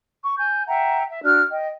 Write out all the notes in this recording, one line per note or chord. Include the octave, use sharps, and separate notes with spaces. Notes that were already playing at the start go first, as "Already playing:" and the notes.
C#6
G#5 G6
E5 F#5 G5 A#5
E5
D4 F#4 F6 F#6
D#5 G5